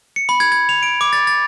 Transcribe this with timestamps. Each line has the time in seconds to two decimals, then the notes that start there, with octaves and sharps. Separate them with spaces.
0.16 C#7
0.29 B5
0.40 G#6
0.52 G#6
0.69 F7
0.83 D7
1.01 D6
1.13 A6
1.27 A6